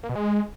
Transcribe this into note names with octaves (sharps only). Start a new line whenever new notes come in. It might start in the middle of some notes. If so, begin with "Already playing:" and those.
A#3
B2
G#3